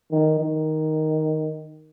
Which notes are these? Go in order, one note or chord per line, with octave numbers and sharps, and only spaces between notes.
D#3
D#3